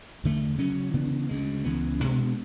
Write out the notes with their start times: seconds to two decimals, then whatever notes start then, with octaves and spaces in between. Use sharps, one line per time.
0.24 E2 D3 A3
0.58 C#3 F#3 C#4
0.94 C#3 E3 B3 D4
1.29 D2 C#3 G#3
1.64 C#2 C#3 E3 B3
2.00 B2 G#3 B3 D4